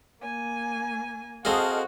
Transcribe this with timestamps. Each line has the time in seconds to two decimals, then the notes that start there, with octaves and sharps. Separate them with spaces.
0.21 A#3 G#5
1.45 C4 F#4 G#4 A4 D#5 F5